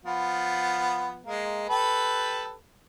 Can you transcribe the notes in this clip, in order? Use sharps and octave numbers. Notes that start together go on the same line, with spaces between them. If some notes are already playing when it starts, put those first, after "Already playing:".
F3 B3
G#3 A#3
G4 A4 B4